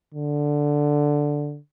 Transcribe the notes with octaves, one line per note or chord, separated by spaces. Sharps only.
D3